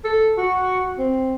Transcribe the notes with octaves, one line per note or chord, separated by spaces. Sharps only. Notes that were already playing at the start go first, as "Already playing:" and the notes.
A4
F#4
C4